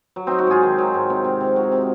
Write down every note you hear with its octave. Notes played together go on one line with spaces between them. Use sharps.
F#3
F#3 C4 D#4
D#4 F#4
G#2 F4 G#4
D#3
F#3
G#2
C3
C3
C3
C3 D#4 F#4
C3